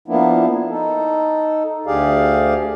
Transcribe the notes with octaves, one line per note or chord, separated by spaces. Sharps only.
F3 A#3 B3 D4 E4
D#4 A4
D2 D3 G4 G#4 D5 F5